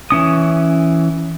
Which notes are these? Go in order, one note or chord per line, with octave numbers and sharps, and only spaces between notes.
E3 C#4 D#6